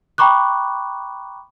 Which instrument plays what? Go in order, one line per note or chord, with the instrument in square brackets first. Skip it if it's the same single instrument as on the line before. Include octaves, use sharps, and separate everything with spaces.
[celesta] G5 A#5 B5 C#6 D6 F#6